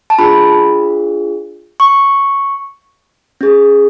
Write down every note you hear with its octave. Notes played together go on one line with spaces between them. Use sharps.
A5
D4 F4 G#4 B5
C#6
C#4 G#4